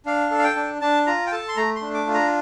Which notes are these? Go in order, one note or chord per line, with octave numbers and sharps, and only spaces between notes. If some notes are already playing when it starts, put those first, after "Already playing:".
D4 F5
A4
F5
G5
D4
D4 A5
F4 A#5
G5
A4 A5
C6
A3 A#5
C6
D4
D6
F4
A#5